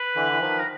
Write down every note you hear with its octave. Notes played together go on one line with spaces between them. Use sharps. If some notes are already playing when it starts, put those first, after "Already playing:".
Already playing: B4
D3 E3
E3
D#3 F3
A#4